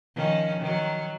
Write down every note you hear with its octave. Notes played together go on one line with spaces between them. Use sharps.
D#3 F3 C#4
D#3 F#3